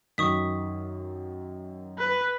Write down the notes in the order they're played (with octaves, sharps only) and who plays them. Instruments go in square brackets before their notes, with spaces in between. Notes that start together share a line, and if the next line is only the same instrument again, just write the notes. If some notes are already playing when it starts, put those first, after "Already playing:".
[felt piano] F#2 D#3 [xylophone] C#6 D#6 B6
[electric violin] B4